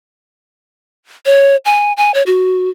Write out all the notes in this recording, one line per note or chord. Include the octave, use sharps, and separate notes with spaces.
C#5
G#5
G#5
C#5
F#4